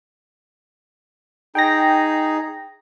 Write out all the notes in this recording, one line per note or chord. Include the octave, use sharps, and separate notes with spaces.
D#4 G#4 G5 A#6